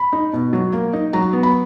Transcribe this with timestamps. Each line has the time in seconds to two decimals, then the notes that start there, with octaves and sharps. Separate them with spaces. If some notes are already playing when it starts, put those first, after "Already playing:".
Already playing: B5
0.13 D#4
0.33 B2
0.53 F#3
0.73 A#3
0.93 D#4
1.13 F#3 A#5
1.33 B3
1.43 B5